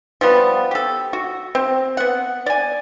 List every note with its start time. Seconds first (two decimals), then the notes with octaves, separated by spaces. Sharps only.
0.21 F3 G3 B3
0.71 G4 A4
1.13 F#4
1.55 C4
1.97 B3 F#5
2.46 D5 G#5